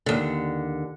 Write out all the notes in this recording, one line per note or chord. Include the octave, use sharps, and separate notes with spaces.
D#2 D3